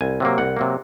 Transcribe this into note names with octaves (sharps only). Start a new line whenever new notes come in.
C2 G#5
C3 F#3 A#3
C2 F#5
C3 F#3 A#3